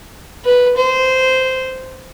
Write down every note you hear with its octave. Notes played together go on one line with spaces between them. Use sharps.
B4
C5